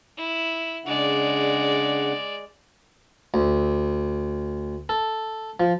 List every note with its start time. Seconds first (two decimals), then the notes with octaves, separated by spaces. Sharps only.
0.17 E4
0.86 C#3 G#3 D4 D5 F#5
3.34 D2
4.89 A4
5.60 F3